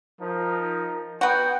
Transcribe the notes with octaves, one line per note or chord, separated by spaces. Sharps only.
F3 D#4 A#4
B3 F#4 G5